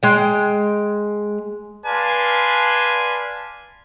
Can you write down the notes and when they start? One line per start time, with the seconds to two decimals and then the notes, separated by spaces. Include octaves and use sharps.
0.03 G#3 G5
1.86 B4 D5 F5 G#5 A5 C6